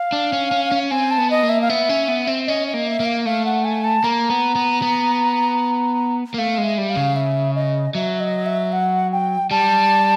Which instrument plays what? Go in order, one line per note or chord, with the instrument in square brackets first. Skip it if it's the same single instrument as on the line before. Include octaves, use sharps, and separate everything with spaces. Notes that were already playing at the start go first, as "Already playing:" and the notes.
Already playing: [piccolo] F5
[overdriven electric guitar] D4
C#4
C#4
C#4
[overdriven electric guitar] C4 [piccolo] G#5
[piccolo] A5
[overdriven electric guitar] B3
[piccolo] D#5
[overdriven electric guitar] A#3
[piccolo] E5
F5
[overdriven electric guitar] B3 [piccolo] E5
[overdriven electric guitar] C#4
B3
C4
[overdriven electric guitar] C#4 [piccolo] D#5
[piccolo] D#5
[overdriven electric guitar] A#3
[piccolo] E5
[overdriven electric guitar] A#3
[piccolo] F5
[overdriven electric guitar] A3 [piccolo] F5
[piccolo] F#5
G#5
A5
[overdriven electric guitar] A#3 [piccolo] A#5
[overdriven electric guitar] B3
B3
B3
A#3
[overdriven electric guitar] A3 [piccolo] F5
[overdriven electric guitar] G#3
[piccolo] E5
[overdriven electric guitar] G3
[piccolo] F5
[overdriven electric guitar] C#3
[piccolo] E5
D#5
[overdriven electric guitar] F#3 [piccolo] E5
[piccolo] D#5
E5
F#5
G5
[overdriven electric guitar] G3 [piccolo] A5